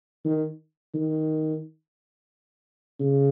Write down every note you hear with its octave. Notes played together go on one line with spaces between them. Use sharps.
D#3
D#3
C#3